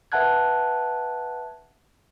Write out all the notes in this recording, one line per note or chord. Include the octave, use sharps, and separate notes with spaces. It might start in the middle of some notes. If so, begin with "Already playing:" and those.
B4 E5 F#5 A5 F#6 G#6